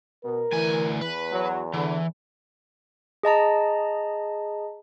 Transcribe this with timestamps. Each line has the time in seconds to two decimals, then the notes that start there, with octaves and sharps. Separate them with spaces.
0.25 B2 A#4
0.53 D2 E3 G#5
1.01 E2 B4
1.31 F#3
1.73 D3 E3
3.23 G#4 D#5 A5 A#5